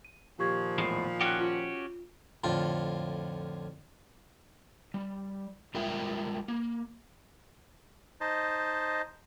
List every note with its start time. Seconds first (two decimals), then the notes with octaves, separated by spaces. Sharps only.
0.05 D#7
0.39 A#2 D#3 F3 G4 C#6 G#6
0.78 E2 A2 G#3 B5 C7
1.21 C#4 F#4 G4 G5 F#6
1.38 F4
2.44 F2 A2 D3 F4
4.94 G3
5.75 G3 G#3 F4 A#4 E5 G5
6.48 A#3
8.21 D#4 C5 D#5 A5